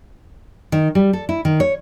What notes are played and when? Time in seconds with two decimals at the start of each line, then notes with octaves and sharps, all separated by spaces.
0.72 D#3
0.95 G3
1.13 A4
1.29 E4
1.45 D#3
1.60 C#5